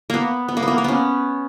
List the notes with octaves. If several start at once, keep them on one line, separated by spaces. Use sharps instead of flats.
A#3 B3
B3
A#3
B3
A#3
A#3
B3 C#4